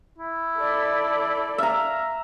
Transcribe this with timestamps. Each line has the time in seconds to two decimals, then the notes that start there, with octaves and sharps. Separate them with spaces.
0.19 E4
0.58 A4 D5
1.58 E5 F5 A#5